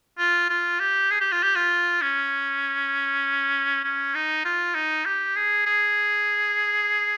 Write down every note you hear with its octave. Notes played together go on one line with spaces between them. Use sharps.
F4
F4
G4
G#4
G4
F4
G4
F4
C#4
C#4
D#4
F4
D#4
G4
G#4
G#4